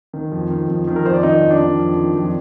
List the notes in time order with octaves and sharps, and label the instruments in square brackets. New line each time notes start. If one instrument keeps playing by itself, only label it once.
[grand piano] D#3
F2
D#3
F2
D#3
A#4
F2 C5
D5
D#3 D#4 D#5
F2
D4 D5
D#3
F2
D#3
F2